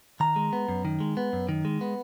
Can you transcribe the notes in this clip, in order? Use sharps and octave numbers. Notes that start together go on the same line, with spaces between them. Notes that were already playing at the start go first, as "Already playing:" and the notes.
D#3 A#5
G#3
B3
F#2
D#3
G#3
B3
F#2
D#3
G#3
B3